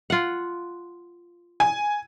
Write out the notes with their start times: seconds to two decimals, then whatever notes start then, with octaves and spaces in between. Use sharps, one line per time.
0.10 F4 F#5
1.60 G#5